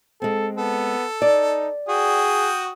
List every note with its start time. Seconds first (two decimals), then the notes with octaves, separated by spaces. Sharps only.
0.22 G#3 C4 A4
0.57 B3 A4
1.22 D#4 D5
1.89 F#4 G#4 G5 D#6